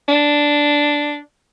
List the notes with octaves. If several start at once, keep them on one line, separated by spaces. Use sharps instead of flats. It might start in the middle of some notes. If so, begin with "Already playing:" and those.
D4